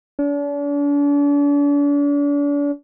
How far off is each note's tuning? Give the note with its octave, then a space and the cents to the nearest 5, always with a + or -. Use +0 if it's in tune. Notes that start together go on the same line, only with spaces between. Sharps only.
D4 -40